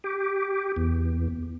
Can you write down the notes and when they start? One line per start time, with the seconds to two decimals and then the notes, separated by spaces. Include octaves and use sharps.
0.04 G4
0.76 E2